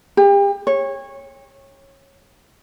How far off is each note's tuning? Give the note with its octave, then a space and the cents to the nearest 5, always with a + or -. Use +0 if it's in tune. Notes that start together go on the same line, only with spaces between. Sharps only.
G4 +35
C#5 -20